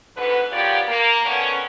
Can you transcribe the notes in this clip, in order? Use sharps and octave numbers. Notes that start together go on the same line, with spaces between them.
G#2 B2 D3 B3 B4
F#2 B3 F4 G4 C#5 D5
A#3
D3 D#3 B3 C#4